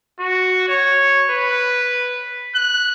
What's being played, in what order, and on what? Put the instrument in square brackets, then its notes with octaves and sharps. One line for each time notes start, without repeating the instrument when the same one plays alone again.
[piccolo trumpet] F#4
C#5
B4
F#6